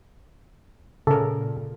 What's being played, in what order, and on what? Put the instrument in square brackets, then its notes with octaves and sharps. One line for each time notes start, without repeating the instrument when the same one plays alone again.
[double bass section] A#2 [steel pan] C#3 A#4 [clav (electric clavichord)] A4